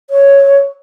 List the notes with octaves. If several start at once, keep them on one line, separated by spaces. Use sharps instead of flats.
C#5